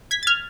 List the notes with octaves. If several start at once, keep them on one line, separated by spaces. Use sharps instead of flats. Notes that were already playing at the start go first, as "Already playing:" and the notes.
G#6 B6
A6
F6 G#6